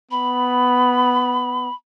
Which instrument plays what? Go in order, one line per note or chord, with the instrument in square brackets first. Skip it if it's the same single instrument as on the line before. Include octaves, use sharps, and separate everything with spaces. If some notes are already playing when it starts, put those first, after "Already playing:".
[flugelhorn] B3 [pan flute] B5